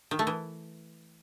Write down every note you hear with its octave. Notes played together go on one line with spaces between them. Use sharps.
D#3
A3
E3